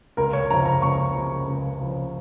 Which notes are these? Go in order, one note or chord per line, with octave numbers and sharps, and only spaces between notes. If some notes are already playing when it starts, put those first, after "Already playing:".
C#2 A#4
C#5
C#3 F3 A#5
A#5
C#2 C#6
C#3 F3
C#2
C#3 F3